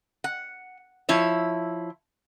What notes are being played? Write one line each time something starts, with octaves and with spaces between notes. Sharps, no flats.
F#5
F3 E4 C#5